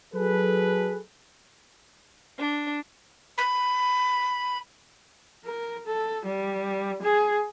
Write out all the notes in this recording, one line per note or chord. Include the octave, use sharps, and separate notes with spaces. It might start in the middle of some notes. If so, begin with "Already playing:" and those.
F#3 G#4 A4 B4
D4
B5
A#4
A4
G3
G#4